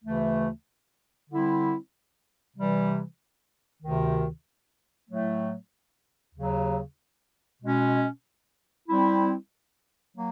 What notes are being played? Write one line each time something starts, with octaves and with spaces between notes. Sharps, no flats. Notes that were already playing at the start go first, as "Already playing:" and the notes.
D2 C#3 E3 A3
D3 G3 C4 E4
C3 E3 G3
D2 C3 D#3
A2 F#3 A3
D#2 C#3 F#3
B2 G#3 C#4
G3 C4 E4
F#3 A#3